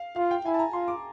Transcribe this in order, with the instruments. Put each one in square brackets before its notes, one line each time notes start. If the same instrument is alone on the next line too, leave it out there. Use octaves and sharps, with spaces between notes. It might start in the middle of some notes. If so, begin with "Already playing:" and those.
Already playing: [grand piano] F5
[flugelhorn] F4 [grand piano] F5
[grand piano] G5
[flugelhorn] E4 [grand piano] G#5
[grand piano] A5
A#5
[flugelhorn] F4 [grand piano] C6
[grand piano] D6